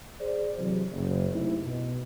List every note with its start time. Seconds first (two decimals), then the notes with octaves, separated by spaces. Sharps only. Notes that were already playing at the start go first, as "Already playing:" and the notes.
0.20 G#4 C5 D5
0.58 C3 E3 F#3
0.92 F#1
1.31 C3 A3 D#4 E4
1.65 B2